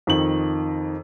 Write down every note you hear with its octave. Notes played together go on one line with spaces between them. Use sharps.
F2 D#3 F#7